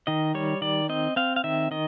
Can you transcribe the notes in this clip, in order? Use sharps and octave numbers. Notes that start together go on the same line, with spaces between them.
D#3 D#5
G3 C#5
D#3 D5
C4 D#5
C4 F5
F5
D#3 E5
D#3 D#5